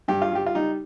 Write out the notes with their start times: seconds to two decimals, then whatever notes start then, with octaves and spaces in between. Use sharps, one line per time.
0.08 G2 G4
0.22 F4
0.32 G3 G4
0.46 F4
0.55 G3 D#4